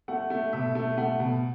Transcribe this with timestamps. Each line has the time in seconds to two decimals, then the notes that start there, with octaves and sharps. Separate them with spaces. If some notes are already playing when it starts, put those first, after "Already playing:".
0.08 A3 F#5
0.30 A3
0.53 B2 E5
0.75 A3
0.98 A3 F#5
1.20 B2